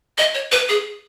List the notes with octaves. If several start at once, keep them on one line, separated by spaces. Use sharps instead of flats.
D#5
C#5
B4
G#4